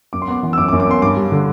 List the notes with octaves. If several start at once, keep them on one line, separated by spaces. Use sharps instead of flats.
F#2 D6
C6
B3 D6
E3
E6
F#2 D6
D6
F#2
D6
B3 C6
G2 D6
G3
D3